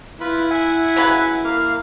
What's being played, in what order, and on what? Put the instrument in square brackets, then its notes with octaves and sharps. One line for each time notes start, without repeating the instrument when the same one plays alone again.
[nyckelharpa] E4 [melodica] F4 B4 B5
[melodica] E5 F#5 G#5
[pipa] C#3 F#3 B4
[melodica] A#3 F5